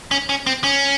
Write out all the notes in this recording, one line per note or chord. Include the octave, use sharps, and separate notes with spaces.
C#4
C#4
C4
C#4